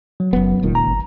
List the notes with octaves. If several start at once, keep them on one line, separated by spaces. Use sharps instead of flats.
F#3
F#1 F#2 B3
D#1 C#2 A#2 D#3
A#5
G1